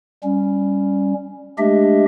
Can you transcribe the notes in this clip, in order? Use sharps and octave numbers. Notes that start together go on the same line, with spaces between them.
G3 C#4
G#3 A3 D4 G4 D#5 E5